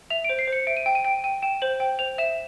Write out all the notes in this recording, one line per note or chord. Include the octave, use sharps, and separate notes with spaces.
E5 F7
C5 D7
C7
C5
C#7
E5 D7
D#7
G5 D7
D#7
G5 D7
G5 D#7
G5 E7
C5 F#7
G5
C5 F7
E5 E7